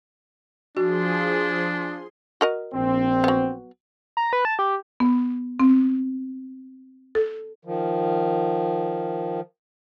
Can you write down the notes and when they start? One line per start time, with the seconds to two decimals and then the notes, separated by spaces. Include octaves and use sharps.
0.77 F3 D4 F#4 G#4 C6
2.41 F#4 A#4 D#5
2.73 A#1 C4
3.24 F#3 B3
4.17 A#5
4.33 B4
4.45 A5
4.59 G4
5.00 B3
5.60 C4
7.15 A4
7.65 D#3 F3